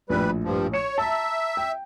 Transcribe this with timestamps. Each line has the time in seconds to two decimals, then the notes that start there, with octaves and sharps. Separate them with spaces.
0.10 A#1 A2 G3 B4
0.44 G2 F3
0.73 C#5 C#7 E7
0.98 E5 A5 A#5
1.57 G5